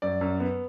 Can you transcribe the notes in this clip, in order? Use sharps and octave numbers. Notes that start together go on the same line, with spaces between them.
F#2 D5
F#2
B3